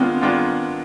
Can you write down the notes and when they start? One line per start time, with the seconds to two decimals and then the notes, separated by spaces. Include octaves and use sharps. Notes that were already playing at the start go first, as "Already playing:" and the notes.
Already playing: D#3 G#3 B3 C4 D4 F4
0.21 D#3 G#3 B3 D4 F4